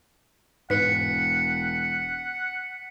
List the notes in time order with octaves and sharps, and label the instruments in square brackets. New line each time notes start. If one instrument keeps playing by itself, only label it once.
[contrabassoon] E1 [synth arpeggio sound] G#2 B4 F#6 [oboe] F#5 [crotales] B6 C#7